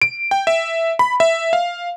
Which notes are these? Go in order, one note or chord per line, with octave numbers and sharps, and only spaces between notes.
D7
G5
E5
B5
E5
F5